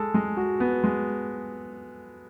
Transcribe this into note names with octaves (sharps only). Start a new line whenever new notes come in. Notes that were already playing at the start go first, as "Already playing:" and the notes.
Already playing: G#3 A4
G#3
F#4
B3
G#3